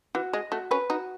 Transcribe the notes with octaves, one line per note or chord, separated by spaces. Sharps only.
E3 F#4
G#3 D#5
A3 F#4
C#4 B4
D#4 F#4